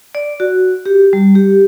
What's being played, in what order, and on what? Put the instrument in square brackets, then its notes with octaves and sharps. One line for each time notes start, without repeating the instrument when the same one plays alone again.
[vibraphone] D5
F#4
G4
G3
G4